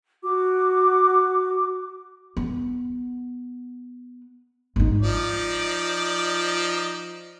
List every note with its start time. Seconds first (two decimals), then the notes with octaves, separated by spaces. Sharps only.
0.23 F#4 D6
2.37 B3
4.76 G#1 D#4
5.02 F3 D#4 D5